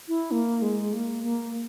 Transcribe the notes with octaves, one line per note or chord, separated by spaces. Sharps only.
E4
A#3
G#3
A#3
A#3